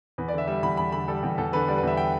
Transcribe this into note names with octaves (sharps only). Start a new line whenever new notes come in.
E2 B4
D5
D3 E5
G3 E5
E2 B5
E2 B5
D3 B5
G3 A4
E2 G4
E2 A4
D3 B4
G3 D5
B4
E2 E5
G5